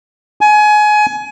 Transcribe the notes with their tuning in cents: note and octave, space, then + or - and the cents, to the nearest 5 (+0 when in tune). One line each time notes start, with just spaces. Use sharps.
G#5 +25